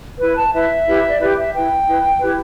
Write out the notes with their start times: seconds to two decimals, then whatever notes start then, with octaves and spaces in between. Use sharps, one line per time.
0.21 E4 B4
0.36 A5
0.53 E4 B4 E5
0.87 E4 G4 B4
1.09 D5
1.20 E4 G4 B4 E5
1.37 E5
1.53 E4 B4 G5
1.86 E4 B4
2.19 E4 G4 B4